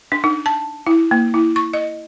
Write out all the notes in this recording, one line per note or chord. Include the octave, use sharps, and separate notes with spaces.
D4
D#4
A5
E4
A#3
E4
C#6
D#5